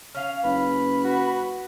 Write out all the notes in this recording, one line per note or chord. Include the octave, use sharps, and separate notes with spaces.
C#4 F5
F#1 B4
F#4